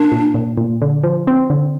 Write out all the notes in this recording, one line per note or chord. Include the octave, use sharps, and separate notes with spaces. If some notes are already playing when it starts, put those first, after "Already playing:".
Already playing: A#3 D4
A#2
A#2
A#2
D3
F3
C4
D3